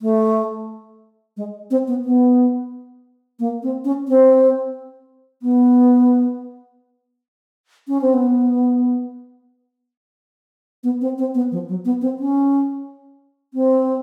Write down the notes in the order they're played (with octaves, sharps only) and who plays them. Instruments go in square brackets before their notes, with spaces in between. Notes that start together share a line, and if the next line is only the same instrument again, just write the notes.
[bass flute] A3
G#3
C4
B3
B3
A#3
C4
C#4
C4
B3
C#4
C4
B3
B3
C4
C4
B3
F3
F#3
B3
C4
C#4
C4